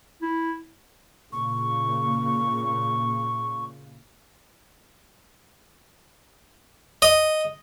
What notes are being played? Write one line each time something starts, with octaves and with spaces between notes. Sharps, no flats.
E4
A#2 C#3 A#3 C#6
D#5